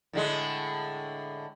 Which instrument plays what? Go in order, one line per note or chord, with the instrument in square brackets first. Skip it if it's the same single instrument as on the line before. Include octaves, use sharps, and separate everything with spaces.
[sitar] A2 D3 G#3